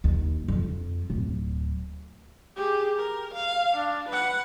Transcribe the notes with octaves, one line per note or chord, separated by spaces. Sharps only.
D#2
F2
D1
G4 G#4
A#4
F5
D4
B4 F#5